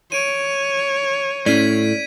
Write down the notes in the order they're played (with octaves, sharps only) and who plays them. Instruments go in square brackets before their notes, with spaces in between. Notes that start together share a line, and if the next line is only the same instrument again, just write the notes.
[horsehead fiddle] C#5 [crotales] D7 D#7
[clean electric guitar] A2 [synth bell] C#4 D5 [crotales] G#6 B6 D#7